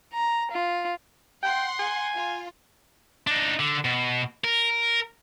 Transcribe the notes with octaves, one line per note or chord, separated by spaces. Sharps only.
A#5
F4
F#5 G5 C6
G#5
F4
D4 D#4
D3
B2
A#4